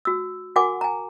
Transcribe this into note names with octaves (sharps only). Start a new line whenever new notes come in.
F#4 E6
F#4 A#4 F#5 G#5 D6
G#5 A#5